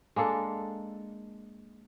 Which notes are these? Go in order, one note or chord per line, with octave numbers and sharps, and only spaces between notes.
G#3 A#3 D4 A4